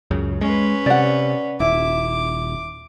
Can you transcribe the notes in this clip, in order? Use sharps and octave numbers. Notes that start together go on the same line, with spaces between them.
C#2 F#2 C#3
G#3 C#4 B4
C3 D5 F#5
D#1 E4 D6